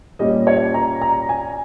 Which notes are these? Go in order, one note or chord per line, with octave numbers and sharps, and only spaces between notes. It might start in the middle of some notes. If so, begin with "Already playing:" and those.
A#2 G3 C#4 D#5
C#5
A#5
A#5
G#5